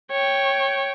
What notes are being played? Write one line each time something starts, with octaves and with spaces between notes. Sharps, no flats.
C#5 G5